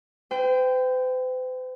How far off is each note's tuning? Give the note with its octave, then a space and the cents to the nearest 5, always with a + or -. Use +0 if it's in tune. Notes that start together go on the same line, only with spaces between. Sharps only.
C5 -45 G5 +0